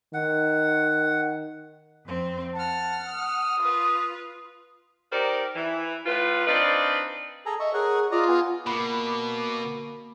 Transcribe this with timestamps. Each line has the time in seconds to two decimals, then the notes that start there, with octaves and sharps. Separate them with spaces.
0.14 D#3 F#5
2.06 F2 C4
2.55 F#5 A5 F6
3.08 D#6
3.60 F4 B4
5.12 D#4 G4 A#4 C5 D5
5.56 E3
6.06 A2 F4 B4
6.47 C4 D4 D#4 B4 D5 F5
7.46 G#4 A4 A#5
7.60 D#5 E5 C#6
7.74 G#4 A#4 C#5 F#5
8.11 F4 D5 D#5 A#5
8.28 B3 G#4
8.67 B2 A#3 B5 D6